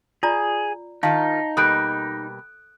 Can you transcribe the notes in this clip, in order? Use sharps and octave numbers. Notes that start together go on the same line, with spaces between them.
F4 G#4 D5 A#5
D#3 D#4 F4 F5 A5
B2 G3 A#3 A4 D#6 F#6 D7